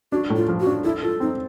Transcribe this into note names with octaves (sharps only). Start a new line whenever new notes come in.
D4 F#4
A2
F4
F3
F#4
D4
E4 A4
F4 A4
C4 D#4